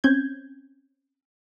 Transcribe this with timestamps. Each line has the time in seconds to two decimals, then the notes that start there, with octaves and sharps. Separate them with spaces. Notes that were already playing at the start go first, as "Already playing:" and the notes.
0.04 C4 C#4 G6 G#6